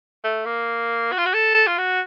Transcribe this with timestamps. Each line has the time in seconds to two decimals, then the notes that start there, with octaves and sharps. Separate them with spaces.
0.24 A3
0.45 A#3
1.12 F#4
1.18 F4
1.26 F#4
1.34 A4
1.55 A4
1.67 F4
1.78 F#4